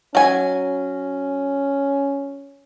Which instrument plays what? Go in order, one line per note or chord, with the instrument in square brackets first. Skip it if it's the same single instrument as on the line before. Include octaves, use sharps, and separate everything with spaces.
[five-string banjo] F#3 G#5 [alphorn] C#4